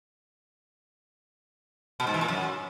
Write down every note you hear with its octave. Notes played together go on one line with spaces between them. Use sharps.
B2
G#2
E3
A#2
F#2